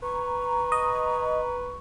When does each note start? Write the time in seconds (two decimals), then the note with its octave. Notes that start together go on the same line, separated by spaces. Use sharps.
0.03 B4 A#5 C#6
0.72 D#5